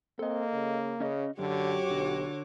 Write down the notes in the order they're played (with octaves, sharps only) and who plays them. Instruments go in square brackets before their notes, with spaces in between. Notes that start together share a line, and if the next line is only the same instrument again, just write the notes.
[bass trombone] A#3 [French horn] C4 [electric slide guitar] A4 D#5
[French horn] C#3
[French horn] C#3 [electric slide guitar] C#4 D#5
[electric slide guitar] F#2 [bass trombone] D3 [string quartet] F#4 C#5 D6 [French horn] G4
[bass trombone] B1 [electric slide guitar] D3